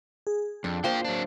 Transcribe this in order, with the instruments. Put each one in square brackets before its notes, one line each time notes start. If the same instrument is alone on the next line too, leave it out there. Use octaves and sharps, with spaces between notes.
[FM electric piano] G#4
[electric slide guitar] F2 [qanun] D4
[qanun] A#3 C5 [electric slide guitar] F4 G5
[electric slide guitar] F#3 D4